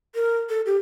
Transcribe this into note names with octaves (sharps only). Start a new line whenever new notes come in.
A#4
A4
G4